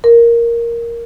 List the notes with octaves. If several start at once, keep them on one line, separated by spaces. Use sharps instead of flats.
A#4